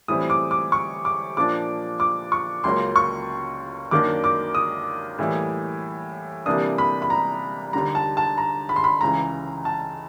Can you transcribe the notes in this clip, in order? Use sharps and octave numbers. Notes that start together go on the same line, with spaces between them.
A2 E3 G3 C4 D#6
D6
D6
C#6
D6
A#2 F3 A#3 D4 D6
D6
C#6
C#2 C#3 F#3 A#3 C#4 C6
C#6
F#2 D#3 F#3 A#3 D4 D6
D6
D#6
A2 E3 G3 A#3
C3 E3 G3 A#3 D4 D#6
B5
B5
A#5
D#2 D3 G3 A#5
A5
A5
A#5
B5
C6
B5
C#2 C#3 E3 A#5
A5